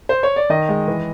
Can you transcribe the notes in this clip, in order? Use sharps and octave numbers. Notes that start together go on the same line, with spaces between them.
C5
C#5
D5
D#3 D#5
G#3
E3